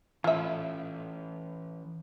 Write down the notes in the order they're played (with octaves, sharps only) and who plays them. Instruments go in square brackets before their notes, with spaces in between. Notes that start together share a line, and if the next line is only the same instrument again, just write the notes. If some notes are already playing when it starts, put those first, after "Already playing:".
[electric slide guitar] E3 C#4 [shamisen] F4 E5